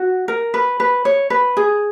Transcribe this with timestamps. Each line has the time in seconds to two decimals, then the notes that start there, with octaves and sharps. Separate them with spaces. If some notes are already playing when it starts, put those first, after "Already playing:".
Already playing: F#4
0.28 A#4
0.54 B4
0.80 B4
1.05 C#5
1.30 B4
1.57 G#4